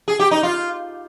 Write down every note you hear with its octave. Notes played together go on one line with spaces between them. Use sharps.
G#4
G4
D#4
F4